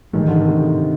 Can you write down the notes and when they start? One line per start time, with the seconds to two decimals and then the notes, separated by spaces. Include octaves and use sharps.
0.13 G#2 D#3 E3 A3
0.28 D3
0.42 C3